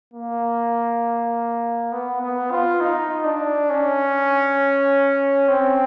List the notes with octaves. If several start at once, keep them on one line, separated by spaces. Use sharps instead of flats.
A#3
B3
B3
F4
D#4
D4
C#4
C4